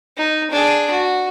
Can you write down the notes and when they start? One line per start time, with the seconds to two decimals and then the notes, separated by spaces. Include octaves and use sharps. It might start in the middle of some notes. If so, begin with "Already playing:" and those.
0.17 D#4
0.50 D4 G#4
0.91 F#4